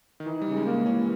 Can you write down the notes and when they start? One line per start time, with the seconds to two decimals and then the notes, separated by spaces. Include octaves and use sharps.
0.20 D#3
0.26 E3 D#4
0.42 G3
0.47 C#3
0.56 G#3
0.66 A#3
0.71 G#3
0.86 E3 C#4